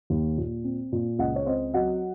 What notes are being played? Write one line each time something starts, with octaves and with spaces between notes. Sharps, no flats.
D#2
A#2
C4
A#2
C#2 D#5 F#5
C#5
C4 C5 D#5
F#3 D#5 F#5